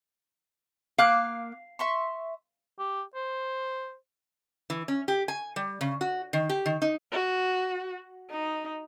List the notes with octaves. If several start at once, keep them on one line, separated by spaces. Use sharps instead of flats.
A#3 F5 D6 F#6
E5 C6 C#6
G4
C5
E3
C#4
G4
G#5
G3
C#3
F#4
D#3
G4
D#3
D#4
F#4
D#4